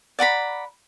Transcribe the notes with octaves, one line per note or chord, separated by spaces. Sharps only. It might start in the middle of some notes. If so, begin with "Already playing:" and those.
D5 F#5 A#5 B5